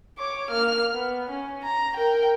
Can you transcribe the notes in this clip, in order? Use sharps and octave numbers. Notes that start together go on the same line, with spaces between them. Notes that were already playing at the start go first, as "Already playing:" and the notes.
C#5 D6
A#3 F6
B3
C#4
A#5
A#4 G5